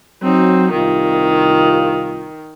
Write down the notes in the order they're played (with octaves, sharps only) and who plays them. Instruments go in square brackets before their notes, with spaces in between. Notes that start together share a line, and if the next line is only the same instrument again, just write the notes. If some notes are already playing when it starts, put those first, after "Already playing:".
[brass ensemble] F#3 [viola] C4 D#4
[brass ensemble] C2 F4 [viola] D#3